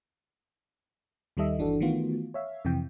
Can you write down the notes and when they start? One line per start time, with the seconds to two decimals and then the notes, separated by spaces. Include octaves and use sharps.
1.37 D#2 D#3 G3 A4 D#5 E5
1.58 G1 E3 D4 F#4 A4
1.80 D#3 E3 A3 B3 F4 F#4
2.34 C#5 E5 F5
2.65 F2 C3 E3 G5